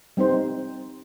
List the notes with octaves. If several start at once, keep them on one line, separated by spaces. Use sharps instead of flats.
G3 C4 D#4 C5